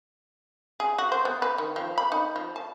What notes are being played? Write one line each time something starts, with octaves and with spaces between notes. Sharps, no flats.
G#4
F#4
C5
B3
B4
D#3
F3
B5
D#4
F3
A5